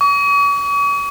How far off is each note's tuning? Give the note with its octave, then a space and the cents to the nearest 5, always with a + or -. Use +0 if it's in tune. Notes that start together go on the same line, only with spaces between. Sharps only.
C#6 +45